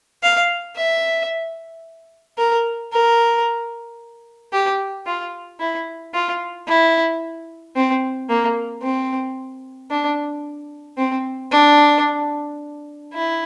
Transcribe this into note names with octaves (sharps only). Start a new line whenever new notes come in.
F5
E5
A#4
A#4
G4
F4
E4
F4
E4
C4
A#3
C4
D4
C4
D4
E4